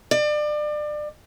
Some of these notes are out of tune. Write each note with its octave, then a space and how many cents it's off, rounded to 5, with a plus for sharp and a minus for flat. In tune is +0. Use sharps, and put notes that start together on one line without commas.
D5 +30